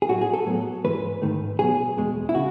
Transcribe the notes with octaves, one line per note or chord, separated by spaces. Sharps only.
G#4
A2 F#3 A3 F#4
G#4
A4
A2 F#3 B3
G#2 E3 G#3 B4
G#2 D#3 A3
B1 B2 F#3 B3 G#4
E2 B2 G#3
E4
C#3 F#4